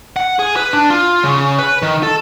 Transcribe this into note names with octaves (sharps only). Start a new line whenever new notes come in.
F#5
G#4
B4
D4
F4
C#3
B4
D#3
A4